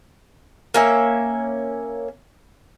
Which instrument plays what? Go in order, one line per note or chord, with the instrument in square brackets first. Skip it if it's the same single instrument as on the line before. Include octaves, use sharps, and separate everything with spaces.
[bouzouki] A#3 C#4 E5